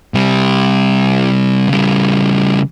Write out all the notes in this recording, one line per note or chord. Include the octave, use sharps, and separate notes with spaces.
C3 G3
C#3 G3